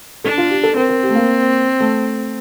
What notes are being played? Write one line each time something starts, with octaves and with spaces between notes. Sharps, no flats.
D4 A4
F4
G4
A4
C4 A#4
A#4
G4
A3
A#3
A3